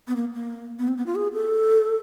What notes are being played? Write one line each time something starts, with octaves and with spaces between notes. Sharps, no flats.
B3
A#3
A#3
B3
C4
B3
F4
G#4
A4